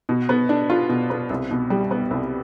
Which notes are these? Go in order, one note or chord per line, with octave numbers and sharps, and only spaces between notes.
B2
B3
D4
F4
B2
B3
C2
B2
G3
B3
C2